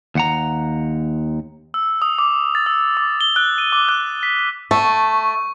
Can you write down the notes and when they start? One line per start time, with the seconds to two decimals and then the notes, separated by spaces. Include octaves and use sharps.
0.15 D#2 F#5 A#5
1.74 E6
2.02 D#6
2.18 D6
2.55 A6
2.66 E6
2.97 D6
3.21 G7
3.36 F#6
3.58 D#7
3.72 D6
3.89 F#6
4.23 B6
4.71 A3 A5 C#6